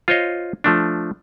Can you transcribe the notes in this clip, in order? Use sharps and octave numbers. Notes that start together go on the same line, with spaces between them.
F4 C5 C#5 D#5
F3 A3 D4